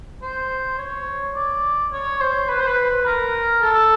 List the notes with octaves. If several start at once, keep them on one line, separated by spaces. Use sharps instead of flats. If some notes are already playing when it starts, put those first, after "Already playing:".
C5
C#5
D5
C#5
C5
B4
C5
B4
A#4
A4